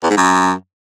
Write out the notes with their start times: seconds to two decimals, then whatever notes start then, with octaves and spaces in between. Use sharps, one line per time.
0.03 E2
0.10 G#2
0.17 F#2